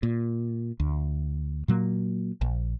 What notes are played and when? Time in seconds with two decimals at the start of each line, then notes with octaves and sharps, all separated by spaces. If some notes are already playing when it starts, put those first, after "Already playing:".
0.03 A#2
0.80 D2
1.68 A#2 F#3 A#3
2.41 A#1